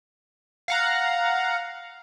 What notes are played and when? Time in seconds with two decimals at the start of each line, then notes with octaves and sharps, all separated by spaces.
0.68 F5 F#5 A#5